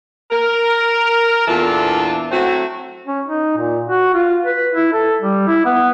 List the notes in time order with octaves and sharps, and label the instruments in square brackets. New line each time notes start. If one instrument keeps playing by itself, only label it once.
[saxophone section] A#4
E2 A#2 E3 D4 F4 A4
F#3 A3 C4 E4 F#4
[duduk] C#4
D#4
A#2
F#4
F4
B4
E4
A4
G3
E4
B3